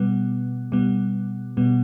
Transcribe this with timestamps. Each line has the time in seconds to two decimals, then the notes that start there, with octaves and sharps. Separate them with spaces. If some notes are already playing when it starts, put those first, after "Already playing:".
Already playing: B2 G3 B3
0.72 B2 G3 B3
1.57 B2 G3 B3